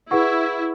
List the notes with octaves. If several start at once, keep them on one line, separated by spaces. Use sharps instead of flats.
E4 G#4 B4 F#5 C#6